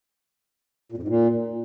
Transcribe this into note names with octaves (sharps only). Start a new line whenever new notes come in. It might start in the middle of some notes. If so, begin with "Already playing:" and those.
A#2
F2
G#2
A#2